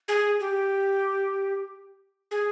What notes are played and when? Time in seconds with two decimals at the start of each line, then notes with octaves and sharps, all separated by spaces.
0.08 G#4
0.40 G4
2.31 G#4